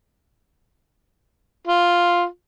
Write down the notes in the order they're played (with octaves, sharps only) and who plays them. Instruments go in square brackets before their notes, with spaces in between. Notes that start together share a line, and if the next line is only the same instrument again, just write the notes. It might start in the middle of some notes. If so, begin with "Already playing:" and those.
[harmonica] F4